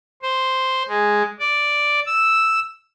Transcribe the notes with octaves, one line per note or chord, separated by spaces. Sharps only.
C5
G#3
D5
E6